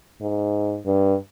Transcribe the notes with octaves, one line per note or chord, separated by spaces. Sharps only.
G#2
G2